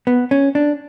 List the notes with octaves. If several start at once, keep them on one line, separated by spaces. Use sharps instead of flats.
B3
C#4
D4